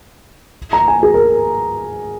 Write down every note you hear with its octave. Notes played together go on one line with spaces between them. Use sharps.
A#5
G#5
G#4
A#4